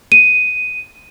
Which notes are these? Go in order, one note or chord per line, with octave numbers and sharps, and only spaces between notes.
D#7